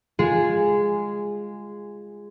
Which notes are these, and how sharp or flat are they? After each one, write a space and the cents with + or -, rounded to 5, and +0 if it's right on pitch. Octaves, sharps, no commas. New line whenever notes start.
G#3 -10 F4 +0 G#4 +0